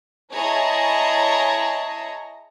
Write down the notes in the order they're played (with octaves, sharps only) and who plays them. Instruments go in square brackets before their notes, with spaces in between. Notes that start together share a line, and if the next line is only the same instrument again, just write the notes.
[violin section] E4 G#4 C#5 D#5 A5 A#5